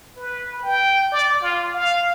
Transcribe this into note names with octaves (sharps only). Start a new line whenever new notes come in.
B4
G5
D5
F4
F5